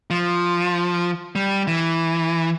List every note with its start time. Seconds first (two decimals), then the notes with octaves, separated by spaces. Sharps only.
0.10 F3
1.35 G3
1.67 E3